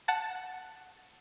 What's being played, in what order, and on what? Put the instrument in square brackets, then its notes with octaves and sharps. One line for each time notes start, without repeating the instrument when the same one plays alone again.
[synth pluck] F#5 A5